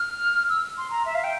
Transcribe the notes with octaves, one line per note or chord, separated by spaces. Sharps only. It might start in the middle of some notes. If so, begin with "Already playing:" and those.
Already playing: F6
E6
C6
A#5
E5
F5
G5